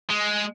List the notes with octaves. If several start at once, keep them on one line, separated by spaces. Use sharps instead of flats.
G#3